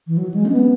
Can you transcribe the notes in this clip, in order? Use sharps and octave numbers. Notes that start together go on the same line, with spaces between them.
E3
F#3
G#3
C#4
B3